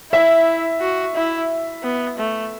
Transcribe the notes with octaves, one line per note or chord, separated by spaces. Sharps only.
E4 E5
F#4
E4
B3
A3